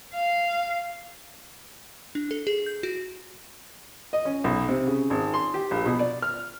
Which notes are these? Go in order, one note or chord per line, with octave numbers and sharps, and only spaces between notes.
F5
D4
A4
G#4
G6
F#4
D#5
C#4
B1
C3
C#3
G#1
C6
G4
A#1
B2
D5
F6